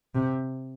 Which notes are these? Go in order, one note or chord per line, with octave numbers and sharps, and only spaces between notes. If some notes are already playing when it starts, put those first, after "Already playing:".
C3